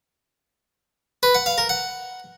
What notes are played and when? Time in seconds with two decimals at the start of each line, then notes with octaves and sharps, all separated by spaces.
1.23 B4
1.35 F#5
1.46 F5
1.58 A#4
1.69 F#5